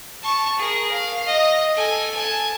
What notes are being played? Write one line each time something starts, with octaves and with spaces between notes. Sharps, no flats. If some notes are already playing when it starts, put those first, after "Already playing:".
A5 C#6
G#4 A#4
F5
D#5
A4 G#5
G#5 A5